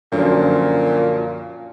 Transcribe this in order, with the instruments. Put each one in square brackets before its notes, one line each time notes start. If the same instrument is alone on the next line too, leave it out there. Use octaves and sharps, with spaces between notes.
[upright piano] F#2 D3 F3 [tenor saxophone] A#2